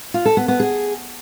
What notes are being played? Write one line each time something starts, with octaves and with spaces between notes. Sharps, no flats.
F4
A4
B3
B3
G#4